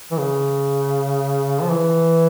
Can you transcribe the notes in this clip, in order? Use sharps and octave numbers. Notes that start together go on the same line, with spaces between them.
E3
C#3
F3
E3